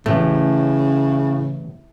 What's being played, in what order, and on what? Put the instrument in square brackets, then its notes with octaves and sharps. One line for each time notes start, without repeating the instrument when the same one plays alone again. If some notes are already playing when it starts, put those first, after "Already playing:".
[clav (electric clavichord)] A1 A3 [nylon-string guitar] A2 [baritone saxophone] C#3